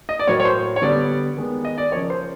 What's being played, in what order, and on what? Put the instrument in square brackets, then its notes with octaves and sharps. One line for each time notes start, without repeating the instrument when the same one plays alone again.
[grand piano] D#5
D5
A2 F#3 A#3 C#5
C#5
C5
C#5
D3 G3 B3 D5
D#3 G#3 B3
D#5
D5
C#3 F3 A#3 C#5
C5